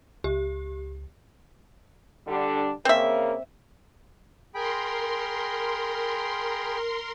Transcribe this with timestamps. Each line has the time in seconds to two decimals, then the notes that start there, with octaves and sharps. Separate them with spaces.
0.24 C#2 G4
2.27 D3 G3 D4
2.85 C#3 A#3 C4 A#4 E5
4.54 G#4 A#4 G5 B5 C6